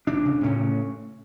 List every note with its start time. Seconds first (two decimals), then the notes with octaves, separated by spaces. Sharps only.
0.07 E1 D4
0.25 C#3
0.43 A2 C#4